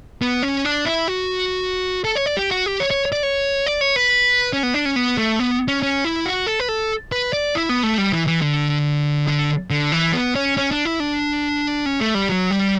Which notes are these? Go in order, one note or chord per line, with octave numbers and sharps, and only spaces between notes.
B3
C#4
D4
E4
F#4
A4
C#5
D5
G4
F#4
G4
C#5
C#5
D5
C#5
D5
C#5
B4
C#4
B3
D4
C#4
B3
A3
B3
C#4
C#4
E4
F#4
A4
B4
A4
B4
D5
E4
B3
A3
G3
E3
E3
D3
D3
D3
E3
B3
C#4
C#4
D4
E4
D4
C#4
A3
G3
F#3
G3